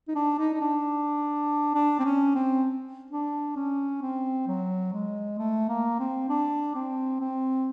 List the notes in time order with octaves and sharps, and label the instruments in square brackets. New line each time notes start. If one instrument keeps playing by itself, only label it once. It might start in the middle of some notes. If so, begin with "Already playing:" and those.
[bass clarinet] D#4
D4
D#4
D#4
D4
D4
C4
C#4
C4
D4
C#4
C4
F#3
G#3
A3
A#3
C4
D4
C4
C4